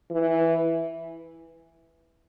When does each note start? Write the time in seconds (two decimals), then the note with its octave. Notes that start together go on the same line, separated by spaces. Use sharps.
0.11 E3